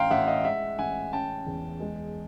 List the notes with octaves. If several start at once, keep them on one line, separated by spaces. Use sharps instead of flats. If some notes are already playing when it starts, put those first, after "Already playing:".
Already playing: A1 F5 G5 A#5 C6
A1 E5 F#5
D#5 F5
G#3 E5 F#5
A1 F#5 G#5
C#4 G5 A5
E2
G#3